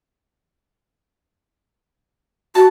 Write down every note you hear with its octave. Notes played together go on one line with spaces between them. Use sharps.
F#4 A5